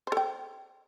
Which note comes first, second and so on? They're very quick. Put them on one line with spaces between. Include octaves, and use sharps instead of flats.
C5 A4 G5